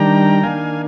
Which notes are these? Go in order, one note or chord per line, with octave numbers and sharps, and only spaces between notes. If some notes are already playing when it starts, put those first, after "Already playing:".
Already playing: D#3 G3 D4 G5 A#5
D#3 A#3 D4 F5 G#5